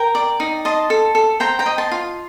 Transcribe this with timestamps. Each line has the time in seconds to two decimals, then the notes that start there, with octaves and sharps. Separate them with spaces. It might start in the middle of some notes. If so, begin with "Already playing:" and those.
Already playing: A#4 G5 A#5
0.15 D5
0.40 D#4
0.65 D#5 A5 C6
0.90 A4
1.15 A4
1.40 C5 G5 A#5
1.59 G5 A#5
1.66 D#5
1.78 A5 C6
1.91 F4